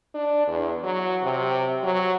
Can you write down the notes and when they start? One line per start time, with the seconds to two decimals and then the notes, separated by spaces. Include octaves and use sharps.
0.14 D4
0.47 E2
0.83 F#3
1.23 C3
1.83 F#3